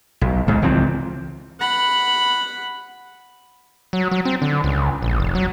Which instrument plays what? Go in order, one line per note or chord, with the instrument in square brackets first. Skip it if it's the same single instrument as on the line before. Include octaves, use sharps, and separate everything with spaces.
[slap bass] B1
D2 G#2
C#2 E3 F3 C4
[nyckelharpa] F#5 B5
[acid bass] F#3
F#3
C4
D3
C#2
A#1
F1
F#3